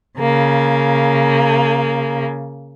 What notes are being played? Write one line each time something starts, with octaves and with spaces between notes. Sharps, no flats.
C#3 A#3